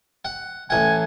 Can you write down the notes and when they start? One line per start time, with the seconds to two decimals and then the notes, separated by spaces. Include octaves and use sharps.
0.25 F#5
0.70 A1 F#5 G#5